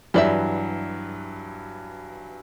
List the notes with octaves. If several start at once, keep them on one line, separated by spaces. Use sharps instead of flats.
G2 E3 F#3 G4 D5 E5